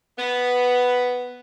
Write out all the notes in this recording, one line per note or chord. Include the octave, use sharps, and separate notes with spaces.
B3